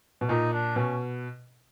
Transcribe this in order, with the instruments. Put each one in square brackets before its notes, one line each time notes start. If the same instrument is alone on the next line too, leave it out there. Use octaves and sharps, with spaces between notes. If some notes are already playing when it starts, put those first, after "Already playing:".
[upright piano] B2
[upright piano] A#2 [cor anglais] D#4
[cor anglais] D4
[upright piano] B2 [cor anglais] C#4